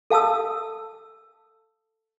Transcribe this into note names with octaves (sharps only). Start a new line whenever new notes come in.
A4 F5 A5 D#6 E6